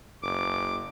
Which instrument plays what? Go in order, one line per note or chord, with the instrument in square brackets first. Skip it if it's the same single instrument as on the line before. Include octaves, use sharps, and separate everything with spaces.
[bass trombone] F#1 [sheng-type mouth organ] D6